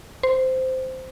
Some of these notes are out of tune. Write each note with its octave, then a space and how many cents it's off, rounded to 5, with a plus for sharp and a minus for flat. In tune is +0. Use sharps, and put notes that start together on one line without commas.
C5 -10